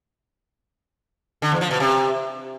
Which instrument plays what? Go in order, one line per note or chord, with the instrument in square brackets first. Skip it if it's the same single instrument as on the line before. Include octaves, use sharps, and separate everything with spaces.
[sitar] D3
E2
F3
B2
C3